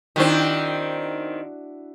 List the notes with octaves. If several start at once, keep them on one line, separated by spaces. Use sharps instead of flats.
D#3 C4 D4 E4 F#4